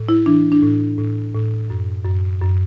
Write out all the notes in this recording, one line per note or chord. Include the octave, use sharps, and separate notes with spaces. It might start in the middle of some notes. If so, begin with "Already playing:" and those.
Already playing: A2
E4
E3 D4
D4
A2
A2
A2
F#2
F#2
F#2